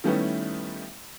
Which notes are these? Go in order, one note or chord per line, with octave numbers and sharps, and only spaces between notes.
D#3 G3 A3 B3 C#4 E4